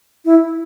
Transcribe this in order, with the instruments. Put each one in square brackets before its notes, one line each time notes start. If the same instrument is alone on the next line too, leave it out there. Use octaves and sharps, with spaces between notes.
[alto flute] E4